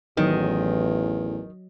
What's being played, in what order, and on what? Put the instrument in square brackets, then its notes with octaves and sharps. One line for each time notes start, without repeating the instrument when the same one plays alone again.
[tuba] A1 [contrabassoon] E2 [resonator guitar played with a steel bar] D#3 [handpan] F#3 D#5